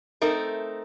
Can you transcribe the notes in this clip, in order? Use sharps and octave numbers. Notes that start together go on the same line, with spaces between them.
A3 C4 D#4 A#4